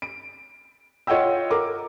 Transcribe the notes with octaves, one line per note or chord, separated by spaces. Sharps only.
D7
F4 C#5 D#5 F#5 G5 E6
A#4 D6